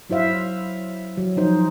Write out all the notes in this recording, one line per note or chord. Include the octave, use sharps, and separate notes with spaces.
F#3 E4 C5 E5 F5
F#3
F3 D#4 C5